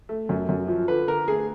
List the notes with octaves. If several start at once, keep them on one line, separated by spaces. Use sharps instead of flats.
A3
F#2
F#2
F3
D3 B4
D3 A#4
A3 G#4